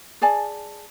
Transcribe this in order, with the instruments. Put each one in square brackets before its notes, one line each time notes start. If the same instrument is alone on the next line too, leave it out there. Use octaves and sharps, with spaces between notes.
[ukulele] G#4 D5 G#5 A5